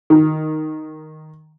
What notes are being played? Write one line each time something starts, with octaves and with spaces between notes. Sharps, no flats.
D#3